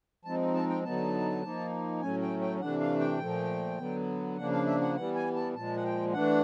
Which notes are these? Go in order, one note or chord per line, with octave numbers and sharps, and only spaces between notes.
F3 G#3 C4 D#4 A5
A5
G5
D3 F#3 B3 D#4 A5
F3 A#3 D#4
A2 F#3 A3 C#4 G#5
G5
G5
C3 E3 A3 D4 F#5
F5
G5
A#2 F3 A3
D3 F#3 B3
C#3 F3 A#3 D4 F#5
F5
E5
F#5
E3 G3 B3 F#5
G#5
A5
A#2 F3 G#3 A5
F#5
G5
E3 A3 D4 F#5